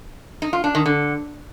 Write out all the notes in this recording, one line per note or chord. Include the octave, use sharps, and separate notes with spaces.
D#4
F4
D4
D#3
D3